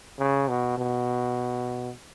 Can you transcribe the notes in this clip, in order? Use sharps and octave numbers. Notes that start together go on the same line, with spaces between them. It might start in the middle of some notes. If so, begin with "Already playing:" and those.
C#3
B2
B2